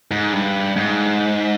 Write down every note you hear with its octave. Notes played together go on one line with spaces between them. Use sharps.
G#2
G2
G#2